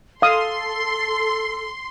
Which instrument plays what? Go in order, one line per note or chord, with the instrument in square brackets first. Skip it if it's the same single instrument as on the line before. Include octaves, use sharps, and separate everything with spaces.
[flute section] A4 [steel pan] F5 D#6 [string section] C6